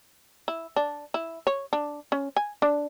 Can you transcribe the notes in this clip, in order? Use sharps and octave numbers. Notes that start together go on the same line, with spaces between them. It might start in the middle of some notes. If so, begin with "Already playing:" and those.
E4
D4
E4
C#5
D4
C#4
G#5
D4